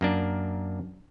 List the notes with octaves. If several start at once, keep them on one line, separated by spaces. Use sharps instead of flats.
F#2 A#3 D4